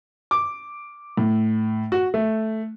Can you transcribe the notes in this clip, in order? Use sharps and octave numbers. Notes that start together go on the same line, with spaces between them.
D6
A2
F#4
A3